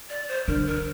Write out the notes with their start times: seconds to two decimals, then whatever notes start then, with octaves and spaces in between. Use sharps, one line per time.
0.10 D5
0.28 C5
0.47 D3 A#4
0.67 A#4